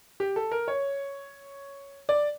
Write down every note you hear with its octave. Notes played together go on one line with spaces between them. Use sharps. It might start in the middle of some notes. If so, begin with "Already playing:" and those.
G4
A4
A#4
C#5
D5